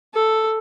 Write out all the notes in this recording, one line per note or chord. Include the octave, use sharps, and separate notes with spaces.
A4